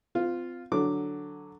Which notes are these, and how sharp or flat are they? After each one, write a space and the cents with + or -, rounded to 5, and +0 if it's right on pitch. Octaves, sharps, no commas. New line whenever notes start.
C4 -35 F4 +0
D3 +0 F#3 +0 D6 +0